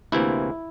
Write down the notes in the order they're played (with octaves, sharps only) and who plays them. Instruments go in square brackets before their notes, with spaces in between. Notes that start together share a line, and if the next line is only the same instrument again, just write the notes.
[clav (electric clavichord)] D2 C3 E3 A#3 E4